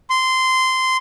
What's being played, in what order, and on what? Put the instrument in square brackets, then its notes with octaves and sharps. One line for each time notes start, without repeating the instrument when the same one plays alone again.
[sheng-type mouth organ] C6